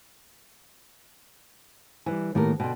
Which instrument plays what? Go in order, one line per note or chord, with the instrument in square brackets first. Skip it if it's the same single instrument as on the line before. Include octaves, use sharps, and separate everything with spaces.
[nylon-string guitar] E3 [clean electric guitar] G3 B4 G#5
[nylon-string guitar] A2 G4 A#4 [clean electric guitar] D#3 A#3 B3
[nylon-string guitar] B2 D3 [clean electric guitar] G5 C6